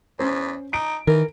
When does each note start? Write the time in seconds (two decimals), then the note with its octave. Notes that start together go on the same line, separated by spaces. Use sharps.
0.19 E2 C#4 C5
0.73 D#4 D7
1.07 D#3 E3 A#4